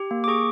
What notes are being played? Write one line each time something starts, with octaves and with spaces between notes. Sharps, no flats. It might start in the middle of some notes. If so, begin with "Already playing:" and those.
Already playing: G4
A#3
D6
G#4 C#6